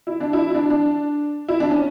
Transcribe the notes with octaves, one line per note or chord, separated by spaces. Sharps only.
E4
D4
E4
E4
D4
D4
E4
D4
C#4